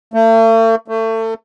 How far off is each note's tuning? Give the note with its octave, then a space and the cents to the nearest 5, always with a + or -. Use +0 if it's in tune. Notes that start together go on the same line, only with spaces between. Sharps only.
A3 +45
A3 +30